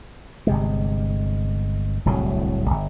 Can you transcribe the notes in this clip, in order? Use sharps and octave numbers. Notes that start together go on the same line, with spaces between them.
G1 C3 G#3
D1 C2 A2 F#3
G1